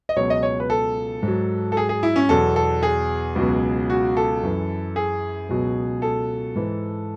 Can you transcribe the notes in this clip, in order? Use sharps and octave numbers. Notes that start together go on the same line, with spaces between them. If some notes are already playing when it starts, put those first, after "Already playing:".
D#5
C#2 B2 F#3 C#5
D#5
C#5
B4
A4
G#2
F#3
A4
G#4
G#4
E4
C#4
E2 B2 F#3 A4
A4
G#4
C#2 B2 F#3
F#4
A4
F#2 E3
G#4
C#2 B2 F#3
A4
G#2 E3